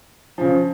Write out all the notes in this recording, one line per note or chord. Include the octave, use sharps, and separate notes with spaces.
C#3 F3